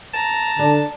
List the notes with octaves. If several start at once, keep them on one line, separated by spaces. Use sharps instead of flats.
A5 A#5
D3 D4